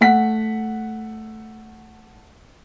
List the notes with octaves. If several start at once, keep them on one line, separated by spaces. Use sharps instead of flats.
A3 F#5 B6